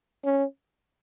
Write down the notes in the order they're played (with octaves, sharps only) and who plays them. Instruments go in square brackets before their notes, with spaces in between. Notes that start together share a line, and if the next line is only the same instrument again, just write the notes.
[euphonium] C#4